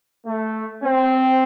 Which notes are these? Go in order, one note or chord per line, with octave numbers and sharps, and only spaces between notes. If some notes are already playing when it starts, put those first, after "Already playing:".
A3
C4